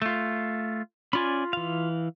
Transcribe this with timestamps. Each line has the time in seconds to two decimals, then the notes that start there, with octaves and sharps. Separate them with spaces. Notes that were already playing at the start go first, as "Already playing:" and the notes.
0.02 A3 F4
1.13 C#4 F4 D5 G#5 B5
1.53 E3 F5